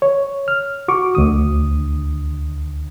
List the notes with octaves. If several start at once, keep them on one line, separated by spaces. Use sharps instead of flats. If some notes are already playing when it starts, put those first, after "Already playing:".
C#5
F6
F#4 C#6 D6
D2 D3 D#6